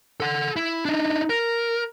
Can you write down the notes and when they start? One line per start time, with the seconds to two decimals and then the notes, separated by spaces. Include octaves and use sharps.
0.20 A4 F#5
0.56 E4
0.85 D4 D#4
1.30 A#4